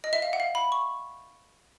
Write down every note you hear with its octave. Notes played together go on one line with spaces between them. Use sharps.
D#5
E5
F5
F#5
F5
B5
C#6